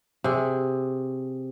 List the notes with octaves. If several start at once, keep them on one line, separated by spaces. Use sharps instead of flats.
C3 G#4